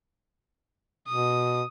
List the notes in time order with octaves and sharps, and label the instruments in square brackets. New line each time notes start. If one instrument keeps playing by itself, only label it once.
[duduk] B2 [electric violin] D#6